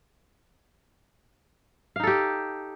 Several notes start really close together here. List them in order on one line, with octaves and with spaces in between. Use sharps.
F5 D#4 A4 G4